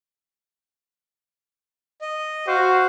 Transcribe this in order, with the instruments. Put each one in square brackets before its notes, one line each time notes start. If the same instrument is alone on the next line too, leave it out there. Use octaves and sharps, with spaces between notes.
[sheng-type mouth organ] D#5
[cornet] F#4 [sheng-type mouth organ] C5 F5